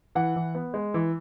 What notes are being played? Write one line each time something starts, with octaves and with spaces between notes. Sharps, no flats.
E3 F#5
E3
B3
G#3
E3